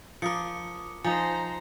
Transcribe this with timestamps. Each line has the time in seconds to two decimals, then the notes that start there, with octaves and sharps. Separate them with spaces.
0.22 F3 A#4 D6 D#6 C#7
1.04 F3 D#4 C5 G#5 A#5